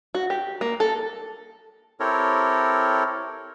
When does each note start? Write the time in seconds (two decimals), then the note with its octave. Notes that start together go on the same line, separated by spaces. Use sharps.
0.15 F#4
0.30 G4
0.61 A#3
0.80 A4
2.00 C4 E4 G4 A4 A#4 C#5